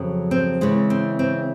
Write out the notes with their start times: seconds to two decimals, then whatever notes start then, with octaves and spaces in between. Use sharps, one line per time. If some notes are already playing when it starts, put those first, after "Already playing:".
Already playing: F2 C#3 F#3
0.31 C4
0.61 C#3 E3 G#3
0.90 C4
1.19 C4